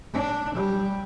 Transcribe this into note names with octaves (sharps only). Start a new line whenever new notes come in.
D4
G3